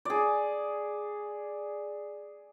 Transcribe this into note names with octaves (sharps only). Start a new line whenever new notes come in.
G#4 D5